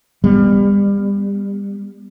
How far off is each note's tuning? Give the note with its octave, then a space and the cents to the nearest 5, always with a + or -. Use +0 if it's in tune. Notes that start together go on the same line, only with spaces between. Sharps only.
G3 +30 B3 +0